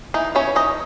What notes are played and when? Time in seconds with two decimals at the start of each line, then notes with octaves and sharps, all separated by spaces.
0.14 E3 D#4
0.35 E3 C#4 C#5
0.55 E3 D#4 D#5